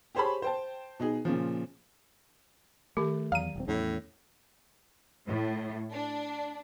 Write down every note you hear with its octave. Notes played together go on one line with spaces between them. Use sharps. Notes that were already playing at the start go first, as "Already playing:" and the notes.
G4 G#4 C5 C#5 A5 B5
C5 G5 A5
B2 D#4 G#4
A#2 C#3 F3
D#3 A3 G4
E2 F#3 F5 A#5 D#7
D#1 C4
E2 A2 C#4
A2
D4